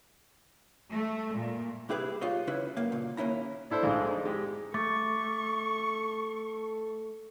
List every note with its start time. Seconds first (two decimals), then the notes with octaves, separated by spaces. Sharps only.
0.92 A3
1.36 A#2
1.89 C2 E4 G4 G#4 B4
2.21 F4 G4 C#5 D#5
2.47 C#3 C#4 E4 B4
2.77 F#2 A#3 F5
2.92 A#2 C#3
3.17 D#2 A#3 C#4 E4 A#5
3.70 D4 E4 A4 C5
3.83 A#1 G#2 G#3 A3
4.11 D#4
4.25 G#3 G4
4.74 A3 A4 C#6 D6 A6